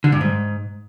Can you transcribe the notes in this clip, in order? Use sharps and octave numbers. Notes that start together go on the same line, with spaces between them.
D3
G2
G#2